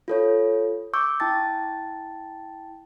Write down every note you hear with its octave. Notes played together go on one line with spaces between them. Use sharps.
F4 A4 C#5
C#6 D6 E6 G6
E4 G5 A5 A6